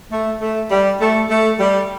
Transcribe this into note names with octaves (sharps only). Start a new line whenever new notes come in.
A3
A3
G3
A3
A3
G3